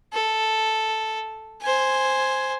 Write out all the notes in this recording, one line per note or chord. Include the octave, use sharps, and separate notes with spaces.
A4
C5 G#5